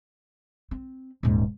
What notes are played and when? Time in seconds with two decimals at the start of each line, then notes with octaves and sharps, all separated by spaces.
0.71 C4
1.23 D#1 G#2